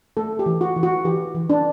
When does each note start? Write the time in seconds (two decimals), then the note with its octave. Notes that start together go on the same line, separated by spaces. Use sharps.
0.17 A3 A4
0.39 G4
0.46 E3
0.61 F#4
0.76 E3
0.83 F#4
1.05 E3 G4
1.35 E3
1.50 D4